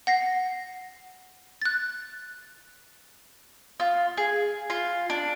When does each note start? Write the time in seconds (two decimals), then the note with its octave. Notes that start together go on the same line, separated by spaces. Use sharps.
0.07 F#5 A#6 C7
1.62 F#6 A6
3.80 F4
4.17 G#4
4.70 F4
5.10 D4